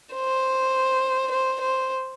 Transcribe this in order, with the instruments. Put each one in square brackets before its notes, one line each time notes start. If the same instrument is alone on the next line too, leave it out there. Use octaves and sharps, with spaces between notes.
[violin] C5
C5
C5